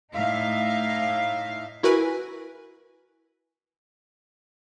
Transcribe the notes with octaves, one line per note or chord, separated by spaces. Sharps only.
A2 D#4 E5 F5
E4 F#4 A#4 B4 G#5